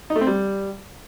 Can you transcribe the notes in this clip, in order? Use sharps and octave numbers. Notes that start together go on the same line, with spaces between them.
D#4
A3
C4
G3